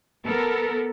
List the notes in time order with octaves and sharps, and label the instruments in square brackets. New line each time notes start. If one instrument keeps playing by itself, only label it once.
[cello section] B3 A4 A#4